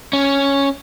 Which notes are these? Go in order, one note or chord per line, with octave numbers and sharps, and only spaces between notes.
C#4